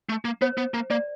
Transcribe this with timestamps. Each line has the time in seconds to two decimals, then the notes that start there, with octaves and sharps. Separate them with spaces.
0.09 A3
0.25 A#3
0.42 B3 C5
0.57 B3
0.74 A#3
0.90 A#3 D5